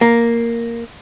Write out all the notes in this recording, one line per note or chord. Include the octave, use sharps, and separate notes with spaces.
A#3